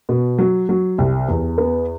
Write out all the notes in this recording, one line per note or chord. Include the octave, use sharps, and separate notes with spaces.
B2
F#3
F#3
C2
E2
B3